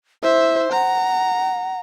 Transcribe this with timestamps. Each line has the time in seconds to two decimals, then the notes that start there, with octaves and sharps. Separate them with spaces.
0.23 E4 C5 E5
0.72 F#5 A#5